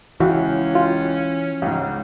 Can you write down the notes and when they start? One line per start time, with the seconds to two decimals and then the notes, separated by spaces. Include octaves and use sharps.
0.20 C#2 E3 C#4 F#4
0.75 F4
1.62 C#2 G#2